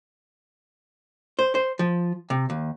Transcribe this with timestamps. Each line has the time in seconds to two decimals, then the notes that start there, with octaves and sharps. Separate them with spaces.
1.39 C5
1.55 C5
1.79 F3
2.30 C3
2.50 D#2